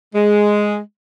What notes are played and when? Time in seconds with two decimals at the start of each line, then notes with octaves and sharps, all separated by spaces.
0.15 G#3